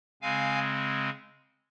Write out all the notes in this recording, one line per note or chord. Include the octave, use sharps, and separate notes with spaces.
C#3 G#3 C4 F5 G#5